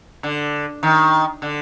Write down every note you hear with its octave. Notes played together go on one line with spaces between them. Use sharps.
D3
D#3
D3